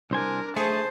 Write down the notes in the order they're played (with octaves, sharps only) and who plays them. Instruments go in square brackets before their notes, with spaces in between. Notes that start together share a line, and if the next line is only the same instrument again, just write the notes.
[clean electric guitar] C2 C5 G#5 [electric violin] D4 A#4
[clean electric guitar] A3 [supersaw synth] G#4 [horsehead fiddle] C5 [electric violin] A5